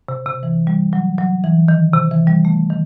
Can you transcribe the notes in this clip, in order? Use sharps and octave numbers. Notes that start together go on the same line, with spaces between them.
C3
C3
E3
G3
F#3
F#3
E3
D#3
C3
E3
G3
A3
D#3